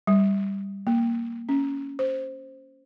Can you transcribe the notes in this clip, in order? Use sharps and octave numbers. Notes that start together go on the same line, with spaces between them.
G3
A#3
C#4
C5